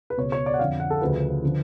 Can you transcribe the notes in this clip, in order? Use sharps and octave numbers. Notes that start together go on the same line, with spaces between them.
B4
C#2 B2 C#5
C#5
D5
F#5
F2 D3 F3 F5
F#5
A4
D2 C#3 F3 B4
D3 F3